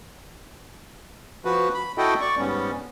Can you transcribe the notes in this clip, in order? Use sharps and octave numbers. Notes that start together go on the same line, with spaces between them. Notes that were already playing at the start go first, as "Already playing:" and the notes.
F3 F#4 B4
B5
E4 F#4 A4 D#5 G5
D5 C#6
G#2 G3 B3 C#4